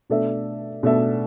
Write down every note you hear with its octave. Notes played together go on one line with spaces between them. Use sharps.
B2 A3 D4 A4 E5
B2 A3 D4 A4 E5